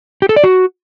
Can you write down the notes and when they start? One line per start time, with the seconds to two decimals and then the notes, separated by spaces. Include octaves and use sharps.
0.22 G4
0.29 A4
0.36 D5
0.44 F#4